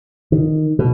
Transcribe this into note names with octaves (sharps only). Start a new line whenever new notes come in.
D#3
B2